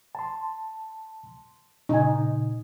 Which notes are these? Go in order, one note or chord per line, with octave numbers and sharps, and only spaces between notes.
A5 C6
A#2 C#3 D#4 G#5